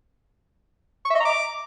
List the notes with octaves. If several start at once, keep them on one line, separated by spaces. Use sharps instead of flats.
C#6
E5
D#5
A#5
D6